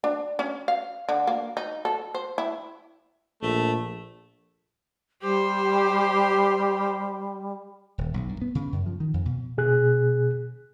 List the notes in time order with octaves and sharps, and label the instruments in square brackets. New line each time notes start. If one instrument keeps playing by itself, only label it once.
[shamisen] D4
C#4
F5
D3
A#3
D#4
A4
C5
E4
[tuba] A#1 [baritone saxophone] A3
[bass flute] G3 [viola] G4 C5
[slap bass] D#1
B1
G2
B3
C#3
F#2
F3
D#3
F2
B2
[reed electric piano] B2 G#4 F#6